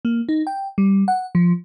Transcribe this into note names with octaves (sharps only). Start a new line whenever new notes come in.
A#3
D#4
G5
G3
F#5
F3